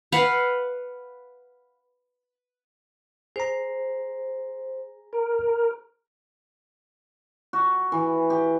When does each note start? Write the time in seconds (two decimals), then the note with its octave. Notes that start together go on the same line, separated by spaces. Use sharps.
0.12 B4 F5 F#5
3.36 G#4 C5 A#5
5.13 A#4
7.53 F#4
7.92 E3
8.30 G4